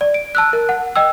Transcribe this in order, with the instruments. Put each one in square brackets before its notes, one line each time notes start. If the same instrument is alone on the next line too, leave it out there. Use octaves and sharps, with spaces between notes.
[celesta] D5
D7
A5 E6 F#6
A#4
F#5
D#5 G5 E6